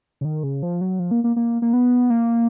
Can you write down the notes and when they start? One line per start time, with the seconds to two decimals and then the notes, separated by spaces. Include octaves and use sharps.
0.21 C#3
0.25 D#3
0.43 C#3
0.63 F3
0.81 F#3
0.99 F3
1.11 A#3
1.24 A#3
1.36 A#3
1.62 A#3
1.73 B3
2.10 A#3